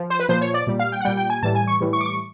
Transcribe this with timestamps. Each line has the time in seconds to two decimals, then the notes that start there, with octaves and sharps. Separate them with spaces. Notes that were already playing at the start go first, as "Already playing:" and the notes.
Already playing: F3
0.10 C5
0.20 B4
0.29 A#2 F3 C5
0.41 C#5
0.54 D5
0.67 A#2 G3
0.79 F5
0.92 G5
1.01 F#5
1.05 A#2 G3 G5
1.17 G5
1.30 G#5
1.43 A2 E3 G3 A5
1.55 G#5
1.67 C#6
1.81 A2 E3 G3
1.93 C#6
2.01 D6
2.06 C#6